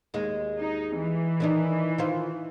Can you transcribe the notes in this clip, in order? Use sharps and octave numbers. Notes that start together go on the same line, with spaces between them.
D#2 G#3
D#4
E3
D#3 D4 D#4
D#3 F4 C5